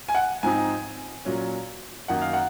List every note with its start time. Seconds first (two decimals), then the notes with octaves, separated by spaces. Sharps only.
0.09 G#5
0.15 F#5
0.43 G#2 F3 C4 D#4 G#5
1.25 A#2 F#3 C#4
2.08 F#2 D#3 A#3 D#4 F#5
2.21 F5
2.33 F#5